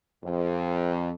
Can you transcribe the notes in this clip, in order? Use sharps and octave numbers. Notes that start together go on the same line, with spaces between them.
F2